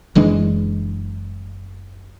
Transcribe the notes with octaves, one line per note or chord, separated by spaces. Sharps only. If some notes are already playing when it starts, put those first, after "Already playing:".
F#1 E3 G#3 D4